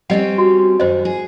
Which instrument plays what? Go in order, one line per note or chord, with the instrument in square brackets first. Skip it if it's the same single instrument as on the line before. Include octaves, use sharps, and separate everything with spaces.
[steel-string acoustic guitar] G3 C4 C#4 [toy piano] D#5 F#5
[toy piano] F#4
[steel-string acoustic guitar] F#2 D#3 [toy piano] C5 D#5
[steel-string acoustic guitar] G#4